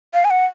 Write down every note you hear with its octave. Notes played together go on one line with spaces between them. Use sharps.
F5
G#5
F#5